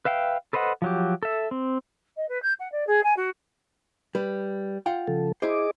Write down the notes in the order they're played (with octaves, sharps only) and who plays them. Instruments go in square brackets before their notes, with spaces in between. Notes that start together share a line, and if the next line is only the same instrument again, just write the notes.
[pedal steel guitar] B4 E5 F5 G5
A4 B4 C5 D#5 F#5
F3 F#3 G4
A4 E5
C4
[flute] D#5
B4
G6
F#5
D5
G#4
G#5
F#4
[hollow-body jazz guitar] G3 B4
F4 F#5 G5
[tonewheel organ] C#3 F3 A4
[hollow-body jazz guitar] E4 C5 [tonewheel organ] G#4 D#5 D6